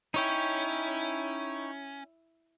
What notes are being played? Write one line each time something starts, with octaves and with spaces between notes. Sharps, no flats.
C#4 D#4 E4 C#5 G5